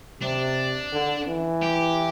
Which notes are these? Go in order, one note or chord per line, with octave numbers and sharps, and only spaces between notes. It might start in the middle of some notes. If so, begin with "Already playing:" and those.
C3 D4
D3
E3
G4